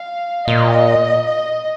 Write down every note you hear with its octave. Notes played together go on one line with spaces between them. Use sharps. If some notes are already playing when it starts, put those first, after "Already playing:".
Already playing: F5
A#2 D#5
D#5